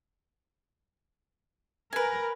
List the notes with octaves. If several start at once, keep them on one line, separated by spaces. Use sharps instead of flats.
A#4 B4 G#5